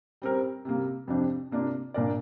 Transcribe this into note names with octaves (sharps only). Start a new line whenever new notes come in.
G3 C4 A#4
C3 G3 A#3
F2 C3 F3 D4 G4
C3 A#3 D4 F4 D5
A#2 A#3 D4 A#4 D5